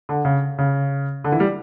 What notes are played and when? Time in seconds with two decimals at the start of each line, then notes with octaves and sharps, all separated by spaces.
0.09 D3
0.25 C#3
0.59 C#3
1.24 D3
1.32 E3
1.40 G3